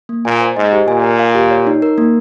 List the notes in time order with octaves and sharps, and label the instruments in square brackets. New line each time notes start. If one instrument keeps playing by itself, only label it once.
[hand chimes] A#3
[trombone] A#2 [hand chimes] G#5
[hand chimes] C5
[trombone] G#2 [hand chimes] D#5
[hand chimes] G4
[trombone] A#2 [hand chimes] G#5
[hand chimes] A#4
F5
G4
C#5
D#4
A#4
A#3